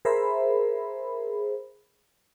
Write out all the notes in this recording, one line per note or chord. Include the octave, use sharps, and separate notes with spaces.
G#4 A#4 C5 E5 B5